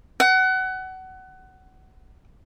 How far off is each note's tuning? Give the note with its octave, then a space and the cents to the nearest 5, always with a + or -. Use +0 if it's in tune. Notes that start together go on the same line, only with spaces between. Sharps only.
F#5 +25